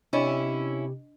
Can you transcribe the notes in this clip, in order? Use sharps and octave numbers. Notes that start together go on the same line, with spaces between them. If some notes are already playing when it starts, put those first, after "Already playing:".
C3 C#4 D4 E4 G4 D#5